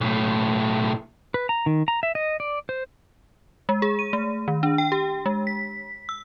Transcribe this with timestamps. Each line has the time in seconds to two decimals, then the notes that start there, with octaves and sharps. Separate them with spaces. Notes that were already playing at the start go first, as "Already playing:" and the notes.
0.01 B1 A2
1.34 B4
1.49 A#5
1.66 D#3
1.88 A#5
2.03 E5
2.15 D#5
2.40 D5
2.69 C5
3.69 G#3
3.82 G#4
3.99 D#7
4.13 A3
4.48 D#3
4.63 D4
4.78 G5
4.92 G4
5.26 G#3
5.47 B6
6.09 E6